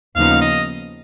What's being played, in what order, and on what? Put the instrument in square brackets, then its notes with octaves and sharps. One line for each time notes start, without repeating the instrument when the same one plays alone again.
[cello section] D#2 C#3 F3 B3 D#4 [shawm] F5
[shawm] D#5